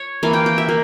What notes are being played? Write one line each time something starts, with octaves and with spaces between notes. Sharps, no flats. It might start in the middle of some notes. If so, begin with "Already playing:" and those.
Already playing: C#5
E3 A#3 F5
G5
G5
E5
A#3